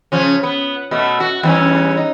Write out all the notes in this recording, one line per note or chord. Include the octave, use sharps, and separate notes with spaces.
C#3 F3 C#4
B3
B2 A3
F#4
E2 G2 C#4
D#4